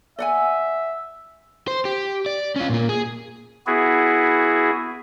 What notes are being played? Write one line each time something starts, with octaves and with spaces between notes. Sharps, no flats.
D5 E5 F#5 G#5
C5
G4
D5
C#4 F4
A#2 A#3
G#4
B3 E4 F#4 G#4